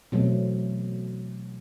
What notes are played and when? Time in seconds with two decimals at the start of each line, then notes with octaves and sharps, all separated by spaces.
0.12 B2 E3 F#3 A3 C4